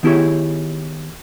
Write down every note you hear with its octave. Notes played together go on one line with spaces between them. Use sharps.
D#3 B3 E4 G4 G#4 C#5